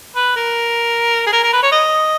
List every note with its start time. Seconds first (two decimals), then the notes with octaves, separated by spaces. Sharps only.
0.16 B4
0.36 A#4
1.26 G#4
1.33 A#4
1.43 A#4
1.53 B4
1.63 C#5
1.72 D#5